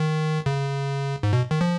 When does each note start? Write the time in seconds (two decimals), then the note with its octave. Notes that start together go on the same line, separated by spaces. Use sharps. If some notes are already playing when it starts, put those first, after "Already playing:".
Already playing: D#3
0.46 C#3
1.23 G#2
1.33 B2
1.51 D#3
1.61 F3